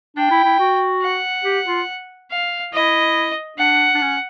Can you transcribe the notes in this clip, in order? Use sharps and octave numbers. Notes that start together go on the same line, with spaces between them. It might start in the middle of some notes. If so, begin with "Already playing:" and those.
D4 G5
E4
E4
F#4
F#5
G4
F4
F5
E4 D#5
D4 F#5
D4
C#4